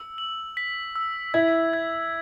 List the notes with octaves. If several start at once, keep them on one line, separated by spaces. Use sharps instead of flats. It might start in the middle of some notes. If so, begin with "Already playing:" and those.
Already playing: E6
F#7
B6
E6
E4 G#6
G#6